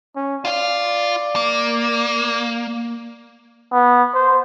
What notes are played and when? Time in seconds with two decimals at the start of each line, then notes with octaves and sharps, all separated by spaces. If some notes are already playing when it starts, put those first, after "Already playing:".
0.16 C#4
0.45 F4 D5 F5
1.36 A#3
3.72 B3
4.14 C5